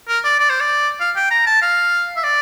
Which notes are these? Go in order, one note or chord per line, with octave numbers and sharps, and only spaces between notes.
A#4
D5
D5
C5
D5
F5
G5
A#5
A5
F5
E5
D5